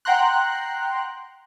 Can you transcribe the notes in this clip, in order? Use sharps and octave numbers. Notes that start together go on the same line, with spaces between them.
F#5 G5 A#5 C6 F#6